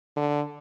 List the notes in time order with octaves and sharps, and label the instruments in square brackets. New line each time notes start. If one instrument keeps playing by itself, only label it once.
[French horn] D3